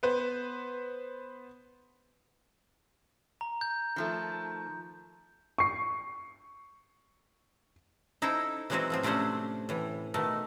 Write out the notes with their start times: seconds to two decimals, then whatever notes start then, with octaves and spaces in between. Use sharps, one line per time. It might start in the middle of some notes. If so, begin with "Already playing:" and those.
0.03 B3 B4 C5
3.41 A#5
3.61 G6
3.96 D#3 F3 A3
5.58 C#6 C7
8.22 D#4 E4 A4 C5 G5
8.70 E3 F#3 G#3 C4 F#4 B4
8.90 A2 F3 C4
9.03 C3 A3 C#4 D4 C5 F#5
9.69 A2 E3
10.14 B2 D#3 A3